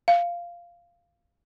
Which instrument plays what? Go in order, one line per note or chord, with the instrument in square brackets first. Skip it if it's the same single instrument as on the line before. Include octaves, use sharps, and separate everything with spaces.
[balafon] F5